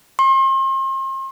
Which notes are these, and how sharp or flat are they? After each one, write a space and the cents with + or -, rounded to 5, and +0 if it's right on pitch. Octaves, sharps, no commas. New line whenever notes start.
C6 +40